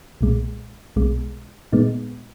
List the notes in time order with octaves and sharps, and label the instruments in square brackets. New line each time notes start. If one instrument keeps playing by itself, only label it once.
[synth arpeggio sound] B1 A#2 G#3
B1 B2 G#3
A#2 G#3 B3 D#4